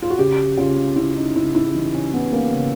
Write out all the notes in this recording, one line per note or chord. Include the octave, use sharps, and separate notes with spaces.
F4
F#4
C#3 G4
C#3 F4
C#3 E4
D#4
C#3 E4
E4
E3 D#4
C#4
E3 B3
A#3
C#3